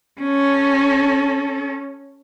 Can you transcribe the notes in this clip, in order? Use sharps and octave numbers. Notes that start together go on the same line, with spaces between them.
C#4 A4